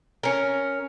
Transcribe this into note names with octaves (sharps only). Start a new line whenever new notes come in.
C#4 A#4